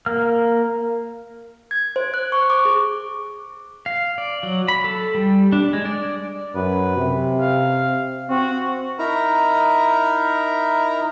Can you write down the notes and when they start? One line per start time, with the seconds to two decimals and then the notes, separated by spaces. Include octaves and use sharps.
0.06 A#3 F6
1.71 G#6
1.96 C5
2.14 F#6
2.32 C#6
2.50 D6
2.65 G#4
3.86 F5
4.18 D5
4.43 F#3
4.68 B5
4.84 A4
5.15 G3
5.52 D4
5.73 G#3
5.85 D5
6.55 F#2 B4
6.97 C3
7.41 F5
8.30 C4 F#4
8.99 D#4 E4 A#4 A#5